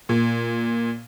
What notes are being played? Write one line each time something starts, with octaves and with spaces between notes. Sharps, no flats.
A#2